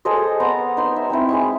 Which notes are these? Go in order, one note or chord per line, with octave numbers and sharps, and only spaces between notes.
G#4 A4 C5 D#5
B3 C5 A#5
D#4 C6
E5
C4 D#4 E4
G#3 E4 C#6